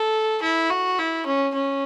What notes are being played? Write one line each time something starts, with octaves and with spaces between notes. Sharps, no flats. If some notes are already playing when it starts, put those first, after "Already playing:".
Already playing: A4
E4
F#4
E4
C#4
C#4